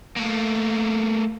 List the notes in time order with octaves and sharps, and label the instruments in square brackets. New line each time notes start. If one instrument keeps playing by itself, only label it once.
[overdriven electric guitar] A3 A#3